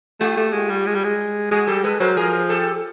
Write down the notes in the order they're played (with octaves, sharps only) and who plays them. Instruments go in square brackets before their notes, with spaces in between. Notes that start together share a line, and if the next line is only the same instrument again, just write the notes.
[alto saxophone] A3 [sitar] F4 G4
[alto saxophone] A3
G#3
G3
G#3
G3
G#3
[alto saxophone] G#3 [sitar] F#4 G#4
[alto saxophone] G3 [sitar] G4 A4
[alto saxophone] G#3 [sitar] A4 B4
[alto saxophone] F#3 [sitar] A#4 C5
[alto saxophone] F3 [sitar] G#4 A#4
[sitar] G4 A4